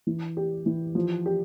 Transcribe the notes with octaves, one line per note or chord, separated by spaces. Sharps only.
E3
G4
E3
F3
G4